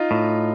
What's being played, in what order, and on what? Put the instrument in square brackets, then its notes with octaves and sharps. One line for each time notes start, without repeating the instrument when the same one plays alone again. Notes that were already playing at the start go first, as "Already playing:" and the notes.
Already playing: [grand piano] D#4 F4
[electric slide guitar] A2